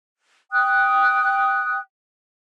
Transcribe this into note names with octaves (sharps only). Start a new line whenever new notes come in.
G5 D#6 F#6